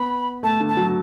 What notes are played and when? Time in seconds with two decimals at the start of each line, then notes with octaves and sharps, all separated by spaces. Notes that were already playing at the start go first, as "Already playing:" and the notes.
Already playing: B3 B5
0.43 A3 A5
0.60 D3
0.69 A5
0.77 F#3